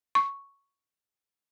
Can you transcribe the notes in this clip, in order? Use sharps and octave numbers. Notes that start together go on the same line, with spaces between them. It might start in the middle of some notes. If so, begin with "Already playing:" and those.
C#6